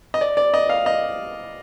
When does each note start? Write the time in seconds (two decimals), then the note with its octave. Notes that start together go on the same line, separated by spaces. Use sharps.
0.14 D#5
0.21 D5
0.37 D5
0.54 D#5
0.69 F5
0.86 D#5